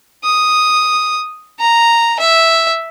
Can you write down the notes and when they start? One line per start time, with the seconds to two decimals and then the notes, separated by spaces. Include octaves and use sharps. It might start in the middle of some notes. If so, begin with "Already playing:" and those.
0.24 D#6
1.60 A#5
2.20 E5